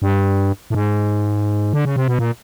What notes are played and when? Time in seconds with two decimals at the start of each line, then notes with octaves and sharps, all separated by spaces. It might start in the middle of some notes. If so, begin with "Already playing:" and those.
0.02 G2
0.70 A2
0.74 G#2
1.73 D3
1.85 C#3
1.96 C3
2.08 B2
2.19 A#2